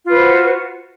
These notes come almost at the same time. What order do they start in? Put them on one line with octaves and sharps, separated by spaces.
F4 B4 C5 F#4